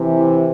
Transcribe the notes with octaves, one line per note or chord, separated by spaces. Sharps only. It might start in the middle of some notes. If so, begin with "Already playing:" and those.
Already playing: C3 E3